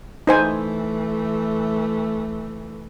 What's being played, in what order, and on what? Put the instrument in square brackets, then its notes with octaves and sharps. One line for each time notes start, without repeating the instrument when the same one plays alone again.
[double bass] E3 A3 [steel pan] D#4 C5 G#5